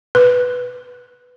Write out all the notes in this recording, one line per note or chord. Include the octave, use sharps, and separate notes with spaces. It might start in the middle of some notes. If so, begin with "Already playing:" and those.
B4